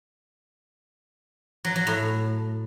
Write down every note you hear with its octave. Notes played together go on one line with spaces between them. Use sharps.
F#3
F#3
A2